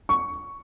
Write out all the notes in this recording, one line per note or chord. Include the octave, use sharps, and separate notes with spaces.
C#6